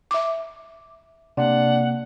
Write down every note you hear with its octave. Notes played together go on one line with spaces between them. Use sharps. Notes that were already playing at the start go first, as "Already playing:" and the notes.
E5 D6
C3 A#3 D4 F#5